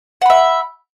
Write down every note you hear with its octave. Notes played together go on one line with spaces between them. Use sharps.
E5 F#5 B5